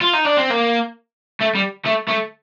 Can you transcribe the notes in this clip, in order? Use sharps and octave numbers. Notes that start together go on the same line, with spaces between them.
F4
D#4
D4
C4
A#3
A3
G3
A3
A3